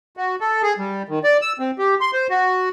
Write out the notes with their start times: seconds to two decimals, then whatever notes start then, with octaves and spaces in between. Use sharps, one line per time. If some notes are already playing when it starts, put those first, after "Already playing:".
0.17 F#4
0.40 A4
0.63 G#4
0.78 G3
1.09 D#3
1.24 D5
1.41 E6
1.59 C4
1.79 G4
2.01 C6
2.13 C5
2.29 F#4